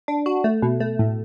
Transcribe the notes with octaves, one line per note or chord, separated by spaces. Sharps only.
D4
F#4
A3
B2
A3
A2